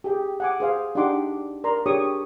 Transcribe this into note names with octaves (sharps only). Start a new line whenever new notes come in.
G4 G#4 G5
F#5 G#5 D6
G#4 C5 F5 G#5
D4 D#4 G4 F#5 C6 D6
A#4 D5 A#5 C6
D4 G4 G#4 C#5 C#6 D#6